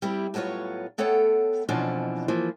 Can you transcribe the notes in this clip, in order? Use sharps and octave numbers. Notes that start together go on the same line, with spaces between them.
G3 C4 E4 G4
A2 F#3 B3 F4 C#5
A3 B3 A4 C#5 F#5 G5
F2 B2 E3 F3 C#4 D4
E3 F3 A#3